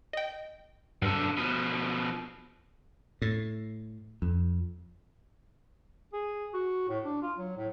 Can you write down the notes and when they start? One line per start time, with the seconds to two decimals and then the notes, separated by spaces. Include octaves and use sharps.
0.13 D#5 G5
1.02 B1 G2 D3
1.37 B2 F3
3.22 A2
4.22 F2
6.13 G#4
6.54 F#4
6.89 A2
7.05 D4
7.22 F4
7.38 F#3
7.57 A2